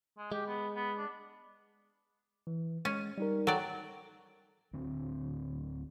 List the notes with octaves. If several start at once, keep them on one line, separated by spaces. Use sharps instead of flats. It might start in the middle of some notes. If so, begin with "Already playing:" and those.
G#3
G#3 G4
B3
B3
D4
E3
G#3 C#4
G3 D#4 A#4
F#3 A4 D5 G5
D1 D3 C4